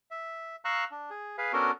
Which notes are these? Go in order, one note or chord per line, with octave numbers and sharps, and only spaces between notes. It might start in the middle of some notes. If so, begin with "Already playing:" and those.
E5
F5 A#5 C#6 E6 F#6
D4
G#4
G#4 B4 F5
B3 C#4 D4 F#4 A4 A#4